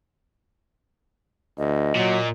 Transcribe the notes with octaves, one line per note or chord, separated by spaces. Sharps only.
D2 D#5
A#2 F#3